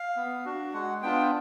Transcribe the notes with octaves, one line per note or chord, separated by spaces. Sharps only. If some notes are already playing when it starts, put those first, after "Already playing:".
Already playing: F5
B3
D4 F#4
G#3 F#5
B3 D4 F4 G5